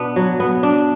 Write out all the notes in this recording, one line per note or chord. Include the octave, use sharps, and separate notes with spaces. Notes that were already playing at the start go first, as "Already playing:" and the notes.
Already playing: B2 B3 D4
F#3
B3
D4